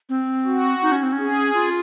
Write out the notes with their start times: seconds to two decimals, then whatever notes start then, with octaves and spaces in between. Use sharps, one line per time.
0.09 C4
0.45 F#4
0.82 D#4
0.92 C#4
1.03 C4
1.13 C#4
1.18 G#4
1.54 F4